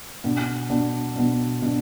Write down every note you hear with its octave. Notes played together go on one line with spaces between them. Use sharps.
B2 B3 D4
B2 B3 D4
B2 B3 D4
B2 B3 D4